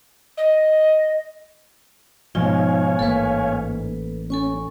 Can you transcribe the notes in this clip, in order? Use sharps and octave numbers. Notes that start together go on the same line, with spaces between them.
D#5
G#2 B2 F3 D#4 C#5 F5 G#5
A1 A#3 A4 B4
C#4 A4 G#5 C#6